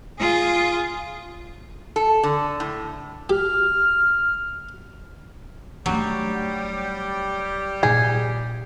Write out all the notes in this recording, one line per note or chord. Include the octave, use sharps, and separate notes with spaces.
F4 G#4
A4
D3
A2
G4 F6
F#3 G3 A3 D4 G4
A#2 D#4 G#4